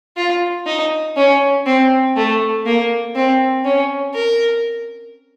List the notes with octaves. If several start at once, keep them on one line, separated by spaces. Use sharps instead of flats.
F4
D#4
C#4
C4
A3
A#3
C4
C#4
A#4